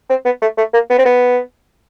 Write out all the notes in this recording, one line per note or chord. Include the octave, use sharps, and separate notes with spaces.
C4
B3
A3
A3
A#3
B3
C4
B3